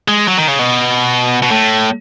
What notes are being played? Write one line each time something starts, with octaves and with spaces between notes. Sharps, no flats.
G#3
F#3
D#3
C#3
B2
B2
A2